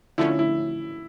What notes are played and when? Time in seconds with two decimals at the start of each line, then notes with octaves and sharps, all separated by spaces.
0.18 D3 F3 A3 C#4 E4
0.39 E4